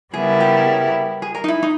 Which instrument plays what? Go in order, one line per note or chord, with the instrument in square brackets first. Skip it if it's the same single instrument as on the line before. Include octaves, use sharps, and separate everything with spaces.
[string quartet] C#3 G3 B3 E4 A#4 [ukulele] G#4
[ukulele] G4
G#4
A#4
D#4
E4
D#4